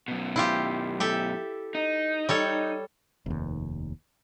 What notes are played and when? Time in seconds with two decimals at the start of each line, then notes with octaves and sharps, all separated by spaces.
0.08 F#2 B2
0.36 E4 F4 G4
1.00 G4 A4 E5
1.75 D#4
2.29 G3 A4 C#5
3.26 F1 D#2